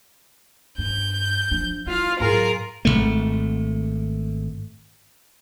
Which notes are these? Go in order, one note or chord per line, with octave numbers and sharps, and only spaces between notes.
G2 G6
F3 D4
E4 F4 F5
G#2 F#3 F4 G#4 A#4
G#1 D#2 A3